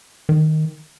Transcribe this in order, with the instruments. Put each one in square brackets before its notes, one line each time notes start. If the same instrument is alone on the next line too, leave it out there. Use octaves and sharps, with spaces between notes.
[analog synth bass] D#3